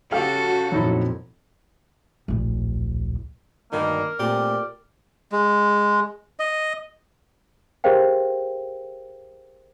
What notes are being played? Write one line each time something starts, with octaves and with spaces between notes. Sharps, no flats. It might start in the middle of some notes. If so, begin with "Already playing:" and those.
C#3 F#4 G4 A4 F5
F2 A#2 F#3 D#4 E4
D1 A#1
D2 G2 D#3 A#3 A#4
A#2 A3 C4 G4 D5
G#3
D#5
G4 G#4 A#4 C5 F5 G5